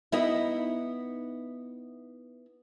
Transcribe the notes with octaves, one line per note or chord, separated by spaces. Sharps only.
B3 D#4 E4